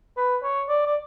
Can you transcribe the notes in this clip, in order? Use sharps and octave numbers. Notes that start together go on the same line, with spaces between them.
B4
C#5
D5
D5